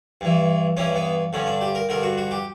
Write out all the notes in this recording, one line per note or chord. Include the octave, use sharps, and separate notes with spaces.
G2 E3
G2 E3 C#4
B3
G2 D3 C#4
D4
G4
A#4
G2 D3 A#4
F#4
F#4
G4